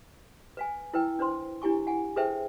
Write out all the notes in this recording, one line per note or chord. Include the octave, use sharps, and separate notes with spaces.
B4 F5 G#5
E4 A#4 B4 G5
D4 B4 C5 C6
D4 E4 G4 G#5 C#6
F#5 G#5
G#4 A4 B4 C5 E5 G5